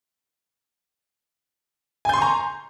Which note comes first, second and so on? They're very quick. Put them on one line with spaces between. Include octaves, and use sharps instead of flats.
G#5 G6 C6 C#6 A#5